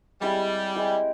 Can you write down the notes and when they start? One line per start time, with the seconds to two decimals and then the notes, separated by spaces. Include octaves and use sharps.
0.21 G3 G#3 C4 E4 G4
0.75 G#3 C4 E4 G4